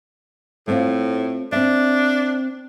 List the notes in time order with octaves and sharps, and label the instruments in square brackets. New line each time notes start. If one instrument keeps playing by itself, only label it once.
[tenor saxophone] A2 [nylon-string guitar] A3 C4 F4
[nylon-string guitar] C4 E5 [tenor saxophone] D4